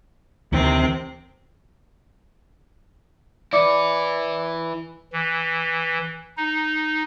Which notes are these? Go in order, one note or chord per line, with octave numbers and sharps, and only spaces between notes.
D2 C3 D#3 E3 C4
E4 B4 D5 D6 C#7
E3
D#4